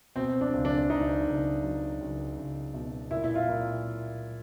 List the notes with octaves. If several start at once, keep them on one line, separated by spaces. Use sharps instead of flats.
B2 C4
D4
C#2
D4
C#2 D#4
C#2
F#3
C#2
C#2
B2
A#2 E4
E4
F4
A#2